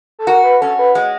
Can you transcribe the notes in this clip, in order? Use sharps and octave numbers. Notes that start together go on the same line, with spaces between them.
A4
F#4 A#4
B4
C#4 A4
B4
G#3